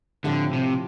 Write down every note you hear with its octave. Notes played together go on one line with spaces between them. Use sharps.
A2 D3 F3 C4 G4
C3